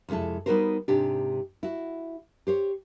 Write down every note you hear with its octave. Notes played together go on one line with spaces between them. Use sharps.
F2 C3 G#3 E4 A4
G3 B3 D#4 F#4 A#4 C5
G#2 C3 D4 G4
E4 F#4
G4 C5 C#5